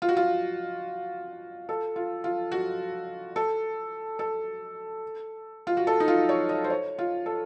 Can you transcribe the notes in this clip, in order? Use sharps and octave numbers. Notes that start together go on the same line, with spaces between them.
F4
F#4
F4
A4
F4
F4
F#4
A4
A4
F4
F#4
A4
D#4
F4
C#5
D#5
C5
C#5
F4
A4